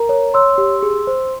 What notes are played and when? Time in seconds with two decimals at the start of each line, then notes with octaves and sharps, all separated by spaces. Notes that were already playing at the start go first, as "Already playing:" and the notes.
Already playing: A#4 A#5
0.09 C#5
0.34 C#5 C6 E6
0.58 G4
0.83 G#4
1.07 C5